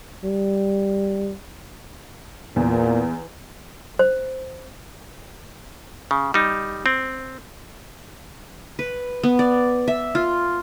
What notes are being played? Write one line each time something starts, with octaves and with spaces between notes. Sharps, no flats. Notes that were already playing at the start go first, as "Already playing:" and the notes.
G3
E2 A#2
C5
C#3
G3 D#4
C4
B4
B3
D5
E5
F4